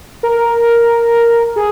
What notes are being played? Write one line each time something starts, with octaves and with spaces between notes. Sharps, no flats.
A#4
G#4